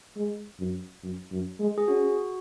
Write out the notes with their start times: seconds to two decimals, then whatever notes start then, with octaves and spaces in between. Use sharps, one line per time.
0.16 G#3
0.59 F#2
1.03 F#2
1.32 F#2
1.60 G#3
1.78 G#4
1.88 C#4 F#4